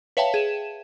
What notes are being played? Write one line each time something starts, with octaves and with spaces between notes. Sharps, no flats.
B4 C#5 E5 F5 G5 A5
G#4 E7